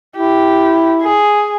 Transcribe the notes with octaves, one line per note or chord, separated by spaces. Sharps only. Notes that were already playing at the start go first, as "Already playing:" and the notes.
E4 G4
G#4